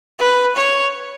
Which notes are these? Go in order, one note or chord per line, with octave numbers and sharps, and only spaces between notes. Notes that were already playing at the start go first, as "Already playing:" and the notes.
B4
C#5